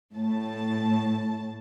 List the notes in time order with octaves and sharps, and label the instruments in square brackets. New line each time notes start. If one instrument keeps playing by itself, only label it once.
[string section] A2 A5